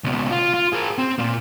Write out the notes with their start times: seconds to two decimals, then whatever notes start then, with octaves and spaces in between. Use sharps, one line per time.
0.04 C#2 B2
0.31 F4
0.54 F4
0.73 G#4 A#4
0.98 C4
1.19 A#2 A#3